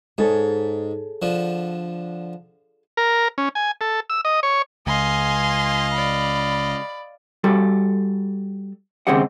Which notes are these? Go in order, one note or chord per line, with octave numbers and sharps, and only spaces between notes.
G#2 G#4 A4 C#5
D3 F3
A#4
C#4
G#5
A4
E6
D#5
C#5
C#2 D#5 F5 G#5 C6
D5 B5
G3 F#4 A4
D#2 C#3 G#3 C4 G4 F#5